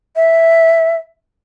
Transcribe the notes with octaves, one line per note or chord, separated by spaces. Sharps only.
E5